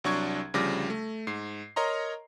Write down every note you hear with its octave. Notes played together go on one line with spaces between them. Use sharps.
C2 F#3 D4 C#6 G#6
D2 C#3 F3 G3 D6 A#6
A3
G#2 C7
A#4 C#5 D#5 A#5 C6